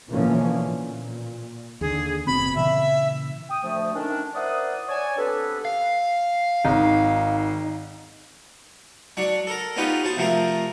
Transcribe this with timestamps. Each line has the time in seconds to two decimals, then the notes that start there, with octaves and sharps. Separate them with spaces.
0.10 B2 D3 E3 F3 A#3 C#4
0.63 A#2
1.81 D#2 D3 G#4
2.27 F#1 B2 C4 B5
2.55 A#2 C#3 E3 E5
3.49 G5 D#6
3.63 D2 F3 A3
3.94 D#3 C#4 D4
4.35 E4 A#4 C5 D5 F#5 D#6
4.89 C#5 D5 G#5 A5
5.16 B3 C4 D4 G4 A4 B4
5.65 F5
6.65 G#1 D#4
9.17 F#3 D4 C#6
9.47 A4 A#4
9.76 B3 C#4 D#4 F4 G4 B4
10.04 F#4 C5 A5
10.17 C3 F3 A3 A#4